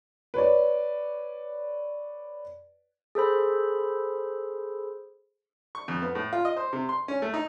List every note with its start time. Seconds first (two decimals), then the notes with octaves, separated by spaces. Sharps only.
0.34 B4 C#5 D5
3.15 G#4 A4 C5 B5
5.75 C#6
5.88 F2
6.02 B3
6.15 A2
6.33 F4
6.45 D#5
6.57 C5
6.73 C3
6.89 C6
7.08 C#4
7.22 A3
7.34 D#4